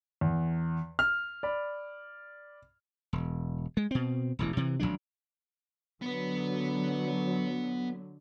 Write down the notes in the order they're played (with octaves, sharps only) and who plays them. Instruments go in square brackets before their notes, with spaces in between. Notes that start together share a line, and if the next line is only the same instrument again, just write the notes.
[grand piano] E2
F6
D5 B5
[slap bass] E1
G#3
B2 C4
E1 A1 E3
C3 E3
G#1 E2 F#3 D4
[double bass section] D3 F#3 [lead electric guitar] B3 B4